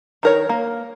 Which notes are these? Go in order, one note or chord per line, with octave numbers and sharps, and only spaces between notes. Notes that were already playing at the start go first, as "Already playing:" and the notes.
D#3 A#4 C#5
A#3